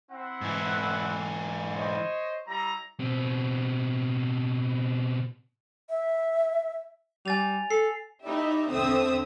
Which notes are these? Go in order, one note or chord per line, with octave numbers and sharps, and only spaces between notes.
C4 E4 F#5
G#2 E3
C5 C#5 D#5
G3 E4 A#5
B2 C4
E5
G3 G#5 A6 F7
A4 C7
D#4 E4 G4 D5 E5
E2 D3 C4 E5 D#6 E6